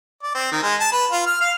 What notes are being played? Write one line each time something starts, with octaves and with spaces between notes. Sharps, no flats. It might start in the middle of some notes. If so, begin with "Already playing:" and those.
D5
C4
D#3
G#3
A5
B4
F4
F6
F5